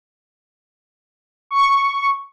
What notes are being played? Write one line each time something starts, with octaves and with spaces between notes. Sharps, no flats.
C#6